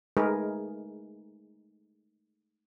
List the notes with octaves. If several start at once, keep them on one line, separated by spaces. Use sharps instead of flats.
G#3 A3 D#4 G#4 A#4 B4